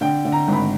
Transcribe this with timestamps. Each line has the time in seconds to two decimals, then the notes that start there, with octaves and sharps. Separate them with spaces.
0.01 D3 G5
0.25 D3
0.32 A#5
0.48 G#1 B5